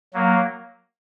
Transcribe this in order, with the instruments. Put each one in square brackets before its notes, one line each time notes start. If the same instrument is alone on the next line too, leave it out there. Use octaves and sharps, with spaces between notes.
[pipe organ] F#3 A#3